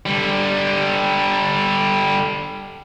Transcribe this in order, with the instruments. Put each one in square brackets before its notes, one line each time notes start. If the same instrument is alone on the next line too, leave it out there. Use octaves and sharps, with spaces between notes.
[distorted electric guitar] D3 G3